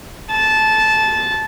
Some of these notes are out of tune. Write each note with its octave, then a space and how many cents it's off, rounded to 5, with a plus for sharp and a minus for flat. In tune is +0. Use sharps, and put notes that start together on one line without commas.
A5 -15